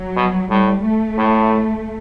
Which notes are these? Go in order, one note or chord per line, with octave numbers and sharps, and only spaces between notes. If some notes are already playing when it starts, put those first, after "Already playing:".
Already playing: F#3
B2
A2 G3
A3
A2